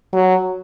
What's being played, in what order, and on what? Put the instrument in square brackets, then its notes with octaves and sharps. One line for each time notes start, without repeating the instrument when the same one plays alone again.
[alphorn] F#3